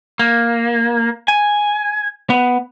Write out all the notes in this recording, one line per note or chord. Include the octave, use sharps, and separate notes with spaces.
A#3
G#5
B3